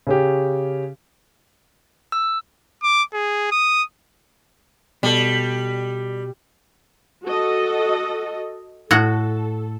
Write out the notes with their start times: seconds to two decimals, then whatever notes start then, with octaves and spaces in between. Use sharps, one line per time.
0.07 C#3 C#4 G4
2.12 E6
2.83 D6
3.13 G#4
3.52 D#6
5.03 B2 G3 A4
7.25 F#4 A4 D#5
8.91 A2 F#4 A4 F#5